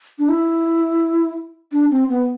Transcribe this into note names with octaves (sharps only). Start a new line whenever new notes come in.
D4
E4
D4
C4
B3